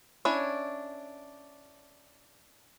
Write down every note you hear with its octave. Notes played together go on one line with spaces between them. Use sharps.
C#4 D4 E4 C#5